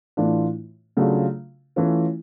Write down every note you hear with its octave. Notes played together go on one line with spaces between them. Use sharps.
A2 E3 A3 D4 F4
C#3 F#3 A3 D4 F4
E3 A3 C#4 F4